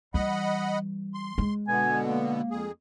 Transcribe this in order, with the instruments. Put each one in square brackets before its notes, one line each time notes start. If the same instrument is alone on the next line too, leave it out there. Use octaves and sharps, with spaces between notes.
[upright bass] E3 G3 [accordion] D#5 F#5 B5
[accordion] C6
[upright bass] G#3
[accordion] B2 D3 B3 [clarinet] G#5
[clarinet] A#3
[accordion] F2 G#4